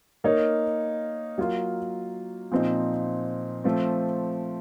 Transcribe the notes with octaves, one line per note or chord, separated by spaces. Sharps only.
A#3 D#4 A#4 C#5
F#3 A#3 F4
A#2 F3 C4 D#4
F3 A3 C4